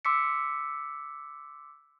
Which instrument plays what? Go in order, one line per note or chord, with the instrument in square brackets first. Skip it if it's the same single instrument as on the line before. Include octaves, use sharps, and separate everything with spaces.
[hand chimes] C6 D6 E6 B6 C#7